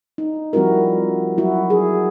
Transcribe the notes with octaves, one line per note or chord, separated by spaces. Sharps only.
D#4
F3 G3 C4 E4 F#4 A#4
F#3 E4 F#4
G#4